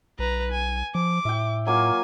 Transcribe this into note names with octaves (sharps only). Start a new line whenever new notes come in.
B1 B4 A#5
G#5
F3 D6
A2 E5 G5
F#3 A#3 F4 G#5